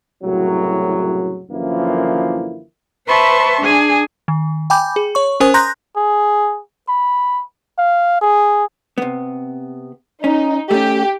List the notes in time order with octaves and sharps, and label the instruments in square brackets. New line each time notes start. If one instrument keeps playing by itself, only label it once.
[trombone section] C2 F#2 A2 C#3 F#3
F#2 D3 E3 F3 A#3 E4
[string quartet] B4 C5 E5 A5 C6 C#6
D4 G#4 G#5
[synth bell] D#3
G5 G#5 B5 D6 G6
G#4
C#5 C#6
C#4 A#4 C5 G#5 D#6
A#5 C6 F#6 G6 A#6
[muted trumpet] G#4
B5
F5
G#4
[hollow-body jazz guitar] C3 B3
[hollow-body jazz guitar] C#4 [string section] D#4
[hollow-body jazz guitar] A3 C#4 [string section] G4